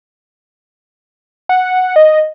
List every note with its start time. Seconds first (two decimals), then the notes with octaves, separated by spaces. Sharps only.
1.49 F#5
1.96 D#5